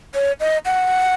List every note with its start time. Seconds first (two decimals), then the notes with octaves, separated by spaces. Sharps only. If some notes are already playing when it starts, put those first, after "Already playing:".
0.15 C#5
0.40 D#5
0.66 F#5